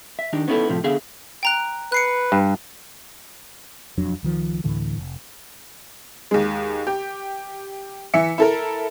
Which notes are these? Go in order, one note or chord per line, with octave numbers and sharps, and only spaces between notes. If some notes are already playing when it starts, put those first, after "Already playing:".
E5
D#3 D4 D#4 G4
B3 C#4 D#4 E4 G#4 A4
A2 C3 F3 A3
D3 B3 G#4 E5 F5
G5 A#5 F#6
B4 F#6 C7 C#7
G2
E1 F2 F#3 D4
C#2 D#3 F3
D2 A2 D3 E3
F1
D#2 G#3
G4
E3 E5 C#7
E4 A4 A#4